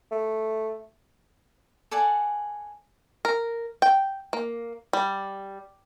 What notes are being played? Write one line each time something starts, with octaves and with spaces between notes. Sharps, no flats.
A3
A4 D5 F#5 G#5
A#4
G5
A#3
G3